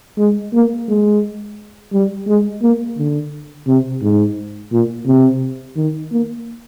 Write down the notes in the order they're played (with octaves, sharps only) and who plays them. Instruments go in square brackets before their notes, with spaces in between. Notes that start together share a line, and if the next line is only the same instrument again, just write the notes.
[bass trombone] G#3
A#3
G#3
G3
G#3
A#3
D3
C3
G#2
A#2
C3
D#3
A#3